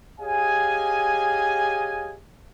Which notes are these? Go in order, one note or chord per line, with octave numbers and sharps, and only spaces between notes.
G4 G#4 C#5 D#5 F5 G#5